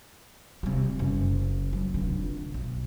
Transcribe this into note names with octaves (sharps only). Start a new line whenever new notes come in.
C3 G3
F#1
F#3
F1 D3
B1